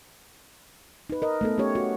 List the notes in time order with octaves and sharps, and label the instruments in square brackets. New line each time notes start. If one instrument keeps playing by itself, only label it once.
[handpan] D#4 B4
A#4 D#5
A3 B3 A4
A3 C#4 G4 C#5
F#4